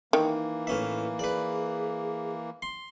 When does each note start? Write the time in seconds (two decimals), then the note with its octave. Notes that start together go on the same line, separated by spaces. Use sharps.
0.13 D#3 E3 A#3
0.67 A2 C#4 B4 E5
1.19 G#4 B4 D5
2.62 C6